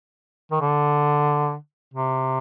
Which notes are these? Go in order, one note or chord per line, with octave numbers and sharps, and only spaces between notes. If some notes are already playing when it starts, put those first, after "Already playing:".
D#3
D3
C3